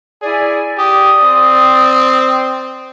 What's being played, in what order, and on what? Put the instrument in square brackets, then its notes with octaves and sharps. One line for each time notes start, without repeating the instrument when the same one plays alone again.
[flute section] E4 D5 G#5 [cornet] G#4
[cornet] G4 [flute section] D5 D#6
[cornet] C4